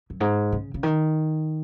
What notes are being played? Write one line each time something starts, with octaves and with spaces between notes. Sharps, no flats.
F#2
G#2
C#3
C#3
D#3